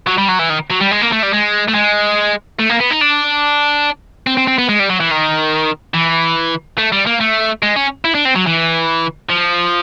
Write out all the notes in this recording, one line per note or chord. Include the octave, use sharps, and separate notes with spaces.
F#3
G3
F#3
E3
D#3
F#3
G3
G#3
A#3
A3
G3
G#3
A3
G#3
A3
A#3
B3
D#4
D4
C4
C4
C4
B3
G#3
G3
F#3
E3
D#3
E3
A3
G3
A#3
A3
G#3
C#4
E4
D4
C4
F#3
E3
F3